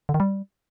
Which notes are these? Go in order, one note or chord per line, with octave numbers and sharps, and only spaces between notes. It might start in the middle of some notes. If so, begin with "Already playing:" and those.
D3
D#3
G3